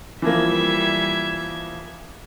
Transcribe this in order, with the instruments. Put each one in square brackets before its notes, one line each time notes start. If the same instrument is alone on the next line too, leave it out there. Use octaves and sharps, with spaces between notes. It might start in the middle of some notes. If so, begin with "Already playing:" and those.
[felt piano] E3 F3 A#3 [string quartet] G3 E5 G#6